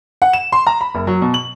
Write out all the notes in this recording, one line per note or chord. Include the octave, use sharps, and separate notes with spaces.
F#5
E7
C6
A#5
B5
F#1
F#3
B2
F#7